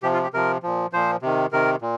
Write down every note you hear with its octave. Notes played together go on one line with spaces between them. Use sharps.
C3 F3 G4
F4
G4
C3 F3 A#4
A#2 F3
A#2 F3 C5
C3 D#3
C3 D#3 A#4
A#2